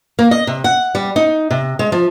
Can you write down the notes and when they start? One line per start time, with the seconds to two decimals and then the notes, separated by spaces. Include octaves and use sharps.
0.19 A#3
0.31 D#5
0.47 C3
0.64 F#5
0.95 G3
1.16 D#4
1.51 C3
1.79 G#3
1.92 F3